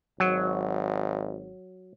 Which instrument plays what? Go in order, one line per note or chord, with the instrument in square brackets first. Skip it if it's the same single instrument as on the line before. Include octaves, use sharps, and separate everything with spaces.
[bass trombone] G#1 [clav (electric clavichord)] F#3